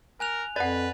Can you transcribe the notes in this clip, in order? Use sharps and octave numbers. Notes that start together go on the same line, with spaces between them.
A#4 G#5 F#6 F7
F2 B4 D5 F#5 A6